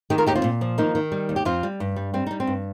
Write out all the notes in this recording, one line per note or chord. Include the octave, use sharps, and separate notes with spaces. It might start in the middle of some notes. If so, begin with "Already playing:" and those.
D#3 D#4 G4
F4 A#4
D#2 D#4 G4
C4 F4
A#2
F3
D#3 A#3 D#4
D#3
G3
D#2
G4
F2 C4 F4
G3
G2
G3
G3 C4
G3 D#4
C4
G2